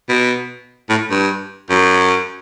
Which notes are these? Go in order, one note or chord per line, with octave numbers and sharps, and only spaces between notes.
B2
A2
G2
F#2